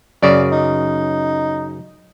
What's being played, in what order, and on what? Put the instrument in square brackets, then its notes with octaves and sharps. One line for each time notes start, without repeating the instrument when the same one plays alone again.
[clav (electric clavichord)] F#2 C#3 [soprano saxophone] D5
[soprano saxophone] D#4